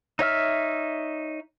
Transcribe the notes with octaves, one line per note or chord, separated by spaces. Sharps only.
D#4 C#5 E5 F6